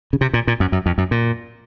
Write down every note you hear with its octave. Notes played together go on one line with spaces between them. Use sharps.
C#3
C3
A#2
A#2
F#2
F#2
F2
F#2
A#2